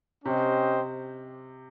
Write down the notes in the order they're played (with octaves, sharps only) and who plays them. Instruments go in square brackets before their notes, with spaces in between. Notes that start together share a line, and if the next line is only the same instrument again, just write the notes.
[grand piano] C3 [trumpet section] C#4 G4 C5 D#5